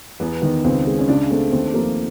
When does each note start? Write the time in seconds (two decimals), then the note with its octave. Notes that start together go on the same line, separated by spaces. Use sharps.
0.20 E2 B3
0.42 D#3 B3
0.64 C#2 C4
0.87 G#3
0.98 C#4
1.08 C#3 D4
1.30 A3 C4
1.52 D#2 C4
1.74 F3 A#3